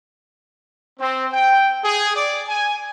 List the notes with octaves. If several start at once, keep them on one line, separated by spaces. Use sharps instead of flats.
C4
G5
G#4
D5
G#5